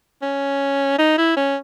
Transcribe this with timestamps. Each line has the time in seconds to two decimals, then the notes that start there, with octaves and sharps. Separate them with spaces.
0.22 C#4
0.99 D#4
1.18 E4
1.36 C#4